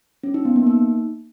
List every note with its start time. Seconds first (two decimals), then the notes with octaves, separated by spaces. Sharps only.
0.24 C#4
0.34 D#4
0.45 B3
0.56 A#3
0.67 D#4